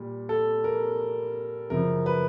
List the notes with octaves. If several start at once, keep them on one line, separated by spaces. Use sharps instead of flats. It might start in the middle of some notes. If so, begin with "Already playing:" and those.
Already playing: A#2 G3
A4
A#4
F#2 C#3 F3 A#4
B4